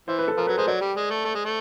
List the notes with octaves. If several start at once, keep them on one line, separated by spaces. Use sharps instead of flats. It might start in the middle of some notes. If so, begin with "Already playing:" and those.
E3 C5
B4
A4
F3 A#4
F#3 B4
G#3 C5
F#3 D5
G3
G#3
A3
A3
G#3
A3